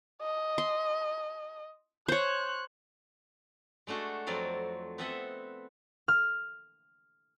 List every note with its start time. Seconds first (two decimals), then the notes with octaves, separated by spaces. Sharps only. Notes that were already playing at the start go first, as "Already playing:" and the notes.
0.22 D#5
0.58 C6
2.08 C5 C#5 F#6
3.87 G#3 A3 D4 F#4 A4
4.27 F2 F#3 C4 D5 F5
4.98 B3 C4 A4 D#5 E5 F#5
6.08 F6